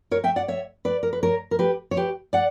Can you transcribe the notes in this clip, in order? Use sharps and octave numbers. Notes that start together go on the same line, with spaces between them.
A#4 C#5
E5 G5
D5 F#5
C#5 E5
B4 D5
A#4
B4
A#4 C#5
A#4
G4 B4
C#5
G4 B4
D5 F#5